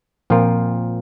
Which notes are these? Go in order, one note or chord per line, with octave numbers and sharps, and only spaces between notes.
A#2 F3 C4 F4 A#4